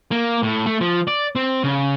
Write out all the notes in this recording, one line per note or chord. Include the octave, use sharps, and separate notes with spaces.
A#3
A2
A3
F3
D5
C4
C#3